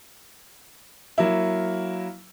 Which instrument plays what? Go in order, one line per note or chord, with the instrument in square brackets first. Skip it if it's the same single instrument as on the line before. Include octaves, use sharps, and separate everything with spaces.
[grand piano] F#3 A#3 E4